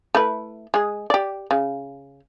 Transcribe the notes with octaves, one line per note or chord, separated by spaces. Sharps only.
A3 E4 B4
G#3 G#4
G4 D5
C#3